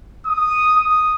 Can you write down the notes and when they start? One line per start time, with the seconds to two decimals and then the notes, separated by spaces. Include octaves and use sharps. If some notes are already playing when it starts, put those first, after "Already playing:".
0.26 D#6
0.77 D#6